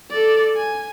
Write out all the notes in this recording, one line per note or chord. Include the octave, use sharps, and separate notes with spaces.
A4 D5
G#5